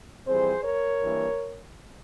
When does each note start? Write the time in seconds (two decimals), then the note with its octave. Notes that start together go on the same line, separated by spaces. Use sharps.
0.27 F2 E3 G3 C4 G#4 C5
0.64 A#4 C#5
1.02 G2 E3 A#3